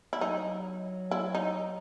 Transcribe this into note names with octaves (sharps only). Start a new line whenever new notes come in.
E4
F#3 D#4
E4
D#4